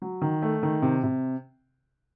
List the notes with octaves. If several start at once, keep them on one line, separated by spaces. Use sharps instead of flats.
F#3
D#3
A3
D#3
C3
C3